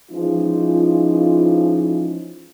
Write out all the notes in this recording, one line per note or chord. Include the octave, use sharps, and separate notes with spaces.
E3 F3 G#3 C#4 D#4 F4